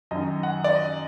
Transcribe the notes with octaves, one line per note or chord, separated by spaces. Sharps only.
F#2 D#3 D#5
F#5
D5
D#5